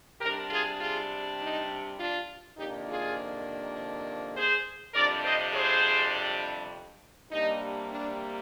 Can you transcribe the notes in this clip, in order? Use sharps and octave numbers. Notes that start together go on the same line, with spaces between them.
C3 G3 D4 G4 A#4
F4 G#4
F4 G#4
D#4
D4 F4
F2 C3 D#3 A#3 D4 D#4 G4
F4 G#4
G#4 C5
F2 C3 G3 D4 A#4 D5
C5 D#5
G#4 C5
C3 G3 A#3 D4 D#4
D4